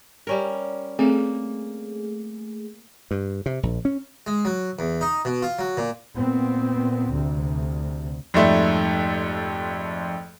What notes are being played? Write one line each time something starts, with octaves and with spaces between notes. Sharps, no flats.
G3 C#4 A#4
A3 A#3 C4 G#4
G2
C3
A#1
C#4
G#3
F#3
E2
D#4
B2
F4
F#3
A#2
A#2 B3 C4
D2 C3
F2 G#2 G3 A3